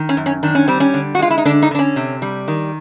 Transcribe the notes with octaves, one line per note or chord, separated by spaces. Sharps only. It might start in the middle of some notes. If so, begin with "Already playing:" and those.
Already playing: D#3
C#4
F#2
C#4
D#3 D4
C#4
G3 C4
C#4
D3
F#4
G#3 F4
E4
D#4
D3 D4
D#4
D3 D4
C#4
C3
G3
D#3